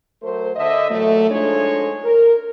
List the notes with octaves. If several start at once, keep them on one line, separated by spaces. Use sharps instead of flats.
F#3 A3 A#4 C5
D3 D#5 E5
A#2 E3 F#3 A3
F3 G#3 D4 D#4 A4 C#5
A#4